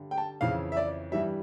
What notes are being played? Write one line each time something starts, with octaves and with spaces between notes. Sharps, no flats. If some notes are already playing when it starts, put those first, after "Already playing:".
Already playing: G2 D3 G3
G5
A5
F2 C#3 E3 F5
E5
D5
G2 E3 G3 E5